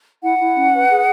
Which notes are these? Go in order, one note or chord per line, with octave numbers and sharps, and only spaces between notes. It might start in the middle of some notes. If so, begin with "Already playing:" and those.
E4 F#5
E4
C#4
B4
G#4